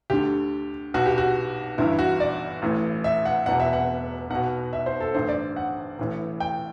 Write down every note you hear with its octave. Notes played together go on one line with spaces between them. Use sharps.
D2 D3 G4
B1 B2 F#4
G4
F#4
G1 G2 E3 E4
F#4
D5
A1 A2 E3
E5
F#5
E1 E2 B2 F#5
E5
F#5
B1 B2 F#5
E5
C5
A4
A1 G2 D3 C5
D5
F#5
A1 A2 E3
G5